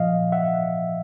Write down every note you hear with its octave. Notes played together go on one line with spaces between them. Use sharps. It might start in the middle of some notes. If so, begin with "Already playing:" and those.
Already playing: A#2 F3 D#5 F5
E5 F#5